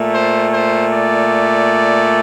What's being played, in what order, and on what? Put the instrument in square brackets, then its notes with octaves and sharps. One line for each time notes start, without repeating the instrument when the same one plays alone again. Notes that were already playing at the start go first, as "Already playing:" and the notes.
Already playing: [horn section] A#2 A3
C5
C5
D5